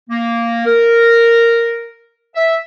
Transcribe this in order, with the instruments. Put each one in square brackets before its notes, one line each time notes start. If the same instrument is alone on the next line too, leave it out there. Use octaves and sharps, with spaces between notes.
[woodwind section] A#3
A#4
E5